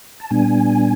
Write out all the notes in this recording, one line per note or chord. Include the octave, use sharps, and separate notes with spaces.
A5
A#2 G3 B3 D4 G#5